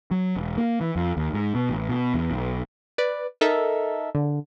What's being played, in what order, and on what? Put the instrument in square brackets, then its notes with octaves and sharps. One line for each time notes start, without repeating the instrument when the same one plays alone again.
[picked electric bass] F#3
E1
A#3
E3
F2
D#2
G#2
B2
A1
B2
E2
B1
[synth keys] B4 D5
D#4 A4 A#4 E5
D3